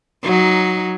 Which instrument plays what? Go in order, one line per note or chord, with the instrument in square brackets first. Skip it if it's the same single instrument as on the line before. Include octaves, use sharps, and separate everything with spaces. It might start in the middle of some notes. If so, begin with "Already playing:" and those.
[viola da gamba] F#3 D#4